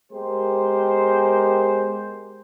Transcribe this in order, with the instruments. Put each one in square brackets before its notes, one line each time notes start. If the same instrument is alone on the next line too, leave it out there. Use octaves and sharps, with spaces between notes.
[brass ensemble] G#3 B3 G4 A#4 C5